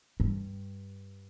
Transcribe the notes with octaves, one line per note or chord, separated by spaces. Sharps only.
G2